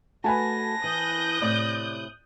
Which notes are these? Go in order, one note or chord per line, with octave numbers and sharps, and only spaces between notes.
A3 F#4 B4 G#5 A5 A#6
E3 D#6 F#6 G6
A2 C3 D5